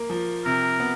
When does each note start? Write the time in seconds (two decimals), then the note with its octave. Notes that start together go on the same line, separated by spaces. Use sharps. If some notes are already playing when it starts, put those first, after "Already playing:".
Already playing: A#3
0.10 F3
0.45 C3 A#4
0.80 B3